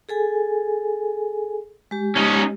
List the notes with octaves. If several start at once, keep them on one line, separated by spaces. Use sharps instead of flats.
G#4 A4 G#5
G#3 G4
C#4 D#4